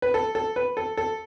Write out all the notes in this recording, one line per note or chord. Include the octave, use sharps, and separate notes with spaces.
B4
A4
A4
B4
A4
A4